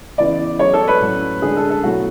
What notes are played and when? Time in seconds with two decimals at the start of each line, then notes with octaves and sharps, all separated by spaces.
0.18 C#3 E3 B3 E4 D5
0.59 F#3 C#4 G#4 C#5 D5
0.73 A4
0.88 B4
1.01 A2 F#3 C#4
1.42 D3 G#3 D4 G#4
1.57 A4
1.70 A4
1.83 B2 F#3 A3 E4 F#4